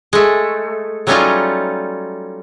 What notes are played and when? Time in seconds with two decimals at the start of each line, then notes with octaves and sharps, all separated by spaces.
0.13 G#3 A3
1.07 F#3 G3 A3 C#4 D#4 F4